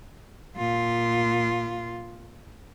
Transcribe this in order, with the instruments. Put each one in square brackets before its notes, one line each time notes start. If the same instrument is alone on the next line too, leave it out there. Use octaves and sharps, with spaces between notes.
[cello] A#2 F4